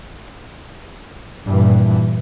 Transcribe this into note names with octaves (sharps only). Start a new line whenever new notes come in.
G2 A#2 E3